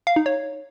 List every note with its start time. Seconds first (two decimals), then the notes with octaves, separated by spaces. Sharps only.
0.07 F5
0.16 D#4
0.26 C#5